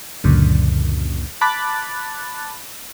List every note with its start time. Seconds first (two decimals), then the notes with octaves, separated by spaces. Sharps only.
0.24 C#2 F#2 A#2 D3
1.41 A5 B5 D6 F#6 A6